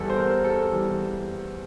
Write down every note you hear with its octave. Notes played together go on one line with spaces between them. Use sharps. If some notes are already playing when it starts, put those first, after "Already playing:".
Already playing: E2 E3 G3 A4
C5
A#4
A4
E2 E3 G3